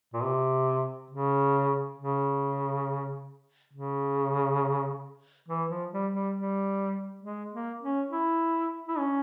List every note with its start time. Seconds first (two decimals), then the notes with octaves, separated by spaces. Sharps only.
0.14 A#2
0.23 C3
1.11 C#3
1.98 C#3
3.73 C#3
5.48 E3
5.70 F3
5.92 G3
6.14 G3
6.36 G3
7.23 G#3
7.52 A#3
7.82 C#4
8.11 E4
8.88 E4
8.98 C#4